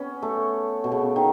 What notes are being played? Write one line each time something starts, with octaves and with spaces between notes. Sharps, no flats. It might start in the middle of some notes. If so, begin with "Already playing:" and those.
Already playing: B3 C#4
A3
B2
C#3
D#3